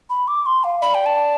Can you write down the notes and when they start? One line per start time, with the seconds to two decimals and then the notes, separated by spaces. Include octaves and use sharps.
0.10 B5
0.28 D6
0.46 C6
0.64 F5
0.82 D5 B5
0.94 G5
1.06 A5